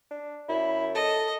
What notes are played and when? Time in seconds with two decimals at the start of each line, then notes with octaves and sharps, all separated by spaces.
0.10 D4
0.49 F#2 E4
0.95 A4 D#5